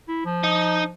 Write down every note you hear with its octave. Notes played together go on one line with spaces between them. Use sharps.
E4
F3
D#4